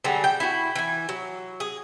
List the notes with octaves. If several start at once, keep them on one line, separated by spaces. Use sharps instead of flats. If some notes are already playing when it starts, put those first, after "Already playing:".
D3 F#3 G3 G#4
G5
E4 F#4
E3 G#5
F#3
G#4